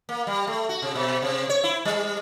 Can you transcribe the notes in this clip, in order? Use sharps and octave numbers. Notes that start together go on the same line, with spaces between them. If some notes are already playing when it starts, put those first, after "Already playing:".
A#3
G3
A3
F#4
C3
B2
C3
C#5
E4
G3